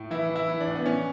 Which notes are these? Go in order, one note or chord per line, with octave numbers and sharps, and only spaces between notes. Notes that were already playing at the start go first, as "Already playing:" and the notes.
Already playing: A2
E3 E4
E3
E4
E3
D4
A2
B3
E3 C#4